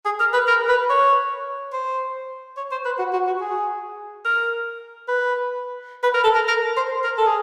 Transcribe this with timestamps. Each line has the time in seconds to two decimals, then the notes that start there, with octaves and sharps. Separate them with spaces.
0.05 G#4
0.20 A#4
0.33 B4
0.47 A#4
0.68 B4
0.89 C#5
1.73 C5
2.57 C#5
2.71 C5
2.85 B4
2.98 F#4
3.13 F#4
3.27 F#4
3.41 G#4
4.25 A#4
5.08 B4
6.03 B4
6.14 A#4
6.24 A4
6.35 A#4
6.48 A#4
6.77 C5
7.04 A#4
7.18 A4
7.27 G#4